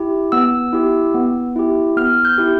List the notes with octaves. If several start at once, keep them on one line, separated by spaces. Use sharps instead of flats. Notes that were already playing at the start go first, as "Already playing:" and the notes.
Already playing: E4 G4
B3 E6
E4 G4
B3
E4 G4
B3 F6
G6
E4 G4